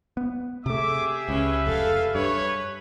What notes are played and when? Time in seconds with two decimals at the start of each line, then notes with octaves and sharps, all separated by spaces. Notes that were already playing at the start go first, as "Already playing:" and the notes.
0.17 B3
0.66 C3 A3 G4 G#4 E5 D6
1.29 C#2 C#4 B4
1.67 F1 A4 F5
2.15 G2 B4 C#5